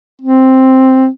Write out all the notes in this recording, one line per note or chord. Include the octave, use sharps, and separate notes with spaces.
C4